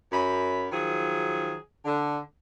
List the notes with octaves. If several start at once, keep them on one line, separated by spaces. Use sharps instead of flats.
F#2 B5
D#3 F3 F#3 G#4
D3